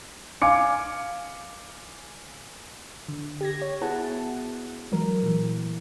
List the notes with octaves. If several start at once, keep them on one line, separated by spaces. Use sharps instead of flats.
F5 G#5 D6 C#7
D3
G4 G#6 A#6
C#5
B3 E4 F#4 G#4 F#5 A5
E3 F#3 G#3 A#4
A#2 E3